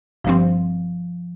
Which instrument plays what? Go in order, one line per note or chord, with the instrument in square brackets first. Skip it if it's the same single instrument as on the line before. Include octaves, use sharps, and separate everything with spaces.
[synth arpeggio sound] G1 G2 G3 C4 [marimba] F3